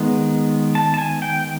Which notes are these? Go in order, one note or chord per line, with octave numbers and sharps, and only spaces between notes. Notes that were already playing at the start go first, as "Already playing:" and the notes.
Already playing: D#3 G#3 B3
A5
A5
G#5
G5